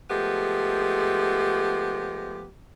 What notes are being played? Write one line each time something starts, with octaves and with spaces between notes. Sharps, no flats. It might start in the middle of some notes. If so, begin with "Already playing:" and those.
F3 G#3 A3 B3 G4